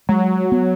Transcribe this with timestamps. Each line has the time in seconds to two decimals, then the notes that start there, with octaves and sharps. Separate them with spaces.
0.09 F#3 G#3
0.52 B3